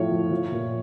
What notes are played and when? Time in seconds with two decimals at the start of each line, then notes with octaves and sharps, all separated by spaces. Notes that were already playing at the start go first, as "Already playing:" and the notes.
Already playing: A2 F3 C#5
0.11 F3
0.31 F3
0.52 A#2